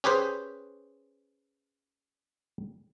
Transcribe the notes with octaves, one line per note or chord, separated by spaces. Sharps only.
C#4 G4 G#4 B4 C5